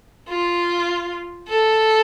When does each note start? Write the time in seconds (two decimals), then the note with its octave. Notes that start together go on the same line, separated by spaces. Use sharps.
0.29 F4
1.48 A4